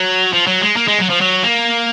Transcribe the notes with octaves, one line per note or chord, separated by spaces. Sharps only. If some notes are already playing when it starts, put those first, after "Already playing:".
Already playing: F#3
F3
F#3
G#3
A#3
G#3
F#3
F3
F#3
A#3